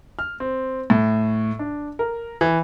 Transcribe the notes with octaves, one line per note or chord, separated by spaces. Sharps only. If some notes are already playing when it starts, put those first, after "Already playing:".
F6
C4
A2
D4
A#4
E3